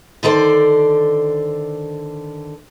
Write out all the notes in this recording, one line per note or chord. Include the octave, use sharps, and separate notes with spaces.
D3 D#3 A4 C5 D5